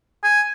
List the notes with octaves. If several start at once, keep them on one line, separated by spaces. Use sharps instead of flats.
G#5